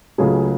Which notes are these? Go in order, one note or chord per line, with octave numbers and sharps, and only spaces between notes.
C#2 C#3 F#3 A3 G#4